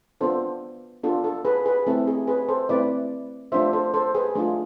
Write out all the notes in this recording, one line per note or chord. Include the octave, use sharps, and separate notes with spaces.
B3 D4 F4 A4 C5
B3 D4 F4 A4
A4
G#4 B4
G#4 B4
A3 C4 E4 A4
G#4
G#4 B4
A4 C5
A3 C4 E4 B4 D5
A3 D4 F4 C5 E5
A4 C5
A4 C5
G#4 B4
A3 D4 F4 G#4